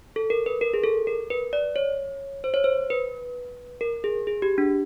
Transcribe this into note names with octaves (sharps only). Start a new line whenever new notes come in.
A4
A#4
B4
A#4
G#4
A4
A#4
B4
D5
C#5
C5
C#5
C5
B4
A#4
G#4
G#4
G4
D4